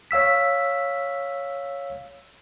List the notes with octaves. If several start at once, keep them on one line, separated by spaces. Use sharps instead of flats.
C#5 F5 E6 B6